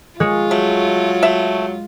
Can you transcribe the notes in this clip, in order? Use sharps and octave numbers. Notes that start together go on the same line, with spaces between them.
G#3 F4 C#5
F#3 A3
A3 E5